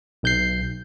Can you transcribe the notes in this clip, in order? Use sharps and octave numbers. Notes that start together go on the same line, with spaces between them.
B1 G6 C7